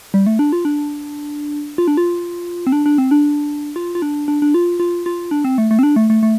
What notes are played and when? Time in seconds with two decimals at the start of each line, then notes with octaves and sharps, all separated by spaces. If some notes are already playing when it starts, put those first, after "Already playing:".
0.14 G3
0.26 A3
0.39 D4
0.53 F4
0.65 D4
1.78 F4
1.88 D4
1.97 F4
2.67 C4
2.72 D4
2.86 D4
2.98 C4
3.11 D4
3.76 F4
3.95 F4
4.02 D4
4.28 D4
4.42 D4
4.54 F4
4.80 F4
5.06 F4
5.31 D4
5.45 C4
5.58 A3
5.71 A3
5.79 C4
5.83 D4
5.96 A3
6.10 A3
6.23 A3